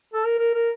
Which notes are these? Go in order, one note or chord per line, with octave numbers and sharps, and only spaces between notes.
A4
A#4
A#4
A#4